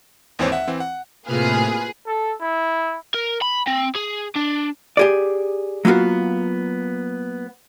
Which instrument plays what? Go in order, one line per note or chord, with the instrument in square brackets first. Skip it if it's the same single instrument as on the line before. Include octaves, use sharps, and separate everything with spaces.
[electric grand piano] G#1 D#2 E3 C4 C5 C#5
E5 F#5
E3 C4
F#5
[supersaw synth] A2 C3 F6 [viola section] A#3 F4 B4 [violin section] G#4
[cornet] A4
E4
[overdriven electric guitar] A#4
B5
C4
G#4
D4
[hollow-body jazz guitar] G4 G#4 D5
F#3 A#3 B3 F4 F#4